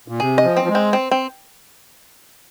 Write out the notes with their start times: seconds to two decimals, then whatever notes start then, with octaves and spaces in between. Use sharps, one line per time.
0.08 A#2
0.20 C3 G#4
0.38 D#5
0.44 F3
0.57 C4
0.64 F3
0.69 G#3
0.75 C4
0.93 C4
1.11 C4